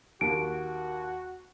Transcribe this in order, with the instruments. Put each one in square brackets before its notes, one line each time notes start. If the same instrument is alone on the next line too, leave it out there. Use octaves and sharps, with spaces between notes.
[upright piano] D#2 A#3 [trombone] F#4 [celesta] D7